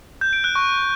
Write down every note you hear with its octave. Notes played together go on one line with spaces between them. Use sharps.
G6
D7
F#6
C#6